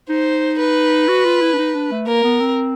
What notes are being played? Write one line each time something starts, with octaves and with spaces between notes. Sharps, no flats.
D#4 C5
B4
F#4
F4
E4
D4
D#4
D4
A3
A#3 A#4
B3
C4